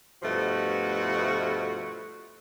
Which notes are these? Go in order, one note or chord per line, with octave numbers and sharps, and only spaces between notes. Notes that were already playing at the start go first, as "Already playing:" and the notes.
G2 B2 F3 A3 E4 F#4